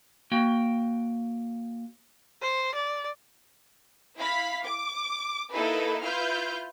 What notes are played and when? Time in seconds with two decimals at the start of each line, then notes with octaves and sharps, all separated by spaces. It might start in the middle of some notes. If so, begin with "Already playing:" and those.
0.32 A#3 F#4 G5
2.42 C5
2.74 D5
4.17 E4 F5 B5 B6
4.62 D6
5.51 A#3 D#4 E4 A4 B4
6.03 E4 F4 B4 F6 G6